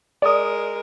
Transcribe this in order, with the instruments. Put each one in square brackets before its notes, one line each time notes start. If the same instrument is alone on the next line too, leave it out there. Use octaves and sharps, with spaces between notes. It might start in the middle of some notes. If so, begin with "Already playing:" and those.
[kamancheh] G#3 A#4 [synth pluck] D5 D#6